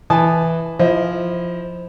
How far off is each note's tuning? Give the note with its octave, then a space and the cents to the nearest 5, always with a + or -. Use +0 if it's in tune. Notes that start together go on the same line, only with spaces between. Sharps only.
E3 +0 A5 -15 D#6 -20
F3 +0 E4 +0 D#5 +25